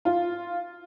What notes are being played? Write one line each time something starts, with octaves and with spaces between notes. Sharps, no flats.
F4